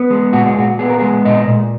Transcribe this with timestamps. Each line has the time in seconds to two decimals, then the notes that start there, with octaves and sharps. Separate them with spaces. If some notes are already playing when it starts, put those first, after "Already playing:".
Already playing: B3
0.11 G#3
0.33 A#2 F#4
0.45 G#4
0.57 A#2 F#4
0.79 B3 G#4
0.90 A#4
0.99 G#3 G#4
1.25 A#2 D#5
1.48 A#2